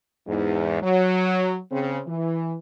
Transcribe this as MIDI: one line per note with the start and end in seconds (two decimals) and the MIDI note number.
0.27 0.81 40
0.27 0.81 44
0.82 1.58 54
1.71 1.99 49
1.71 1.99 60
2.06 2.54 52